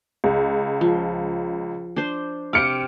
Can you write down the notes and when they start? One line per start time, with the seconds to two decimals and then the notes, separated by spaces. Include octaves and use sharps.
0.24 C#2
0.81 F3
1.96 D4 C5
2.53 C3 C5 D6 F6 C#7 D7